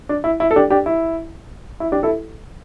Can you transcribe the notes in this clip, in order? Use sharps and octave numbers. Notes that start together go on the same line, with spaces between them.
D4
E4
E4
A4
D4 G4
D4 G4
E4
E4
D4 G4
E4 A4